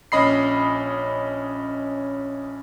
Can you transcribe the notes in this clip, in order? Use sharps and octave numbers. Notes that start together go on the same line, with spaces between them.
A#1 C#4 D#5 B5 C7